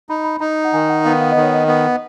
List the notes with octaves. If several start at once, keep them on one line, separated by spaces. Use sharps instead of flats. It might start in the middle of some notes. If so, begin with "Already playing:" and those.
D#4 B5
A#5
B5
D#4 A#5
F#5
D#3 G#5
F#5
D#5
B3 F5
F5
D#3 D#5
C#5
D#5
B3